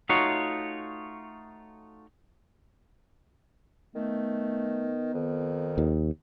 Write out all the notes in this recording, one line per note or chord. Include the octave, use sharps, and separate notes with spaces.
A3 D#4 F4 F#4 C#5
D#3 A3 B3
F2 D#3
D#2